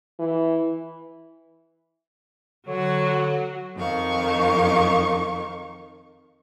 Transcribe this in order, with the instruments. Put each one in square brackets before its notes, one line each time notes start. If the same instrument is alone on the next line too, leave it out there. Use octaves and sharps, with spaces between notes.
[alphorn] E3
[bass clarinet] D3 [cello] F#3 F#4 [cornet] C#5
[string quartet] F2 D#3 F5 C#6